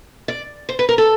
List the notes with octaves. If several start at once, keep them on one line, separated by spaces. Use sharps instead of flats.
D5
C5
B4
A#4
A4